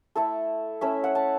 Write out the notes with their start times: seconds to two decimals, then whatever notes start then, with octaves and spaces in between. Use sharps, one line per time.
0.15 A3 E4 A4
0.81 A3 C#4 E4 E5
1.04 F#5
1.15 A5